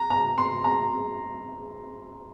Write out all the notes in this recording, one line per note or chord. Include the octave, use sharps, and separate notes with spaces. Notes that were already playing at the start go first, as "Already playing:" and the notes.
Already playing: A#5
A#5
C6
A#5